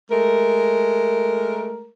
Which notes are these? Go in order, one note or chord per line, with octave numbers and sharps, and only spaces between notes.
G#3 A3 A#4